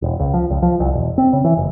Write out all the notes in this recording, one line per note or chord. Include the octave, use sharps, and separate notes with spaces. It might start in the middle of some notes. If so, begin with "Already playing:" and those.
E1
C#2
F3
C#2
F3
C2
E1
C4
C#3
E3
F#1